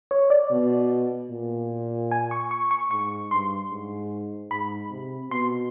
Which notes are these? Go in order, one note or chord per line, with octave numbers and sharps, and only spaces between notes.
C#5
D5
B2
A#2
G#5
C#6
C#6
C#6
G#2 C#6
G2 C6
G#2
G#2 B5
C3
B2 C6